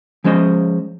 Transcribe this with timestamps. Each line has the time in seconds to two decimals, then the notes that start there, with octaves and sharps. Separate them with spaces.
0.24 F3 G#3 C#4 C5 D#5